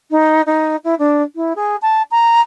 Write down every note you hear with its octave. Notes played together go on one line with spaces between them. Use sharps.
D#4
D#4
E4
D4
E4
G#4
A5
A#5